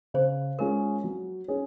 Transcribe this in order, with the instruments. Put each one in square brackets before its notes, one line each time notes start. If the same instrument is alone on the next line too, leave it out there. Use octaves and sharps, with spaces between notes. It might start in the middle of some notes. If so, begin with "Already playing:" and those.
[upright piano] C#3 [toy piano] C5
[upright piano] G#3 C#4 F4 G#4 [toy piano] A#4
[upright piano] F#3
C#4 G#4 C#5